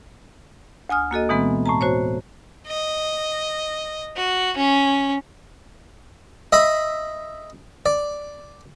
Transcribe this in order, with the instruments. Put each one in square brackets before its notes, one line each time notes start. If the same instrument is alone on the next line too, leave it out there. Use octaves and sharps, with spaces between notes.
[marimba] D2 G#5 D#6 F6
A#3 F#4 A4 D#5
B2 E3 G#3 B3 C4
A2 A5 A#5
F#4 C5 C#5
[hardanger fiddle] D#5
F#4
C#4
[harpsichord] D#5 E5 B5
D5